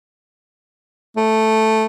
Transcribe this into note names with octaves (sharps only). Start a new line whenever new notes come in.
A3